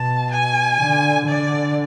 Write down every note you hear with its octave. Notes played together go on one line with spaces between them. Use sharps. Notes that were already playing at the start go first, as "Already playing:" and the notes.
Already playing: B2 A5
G#5
D3
D3 D5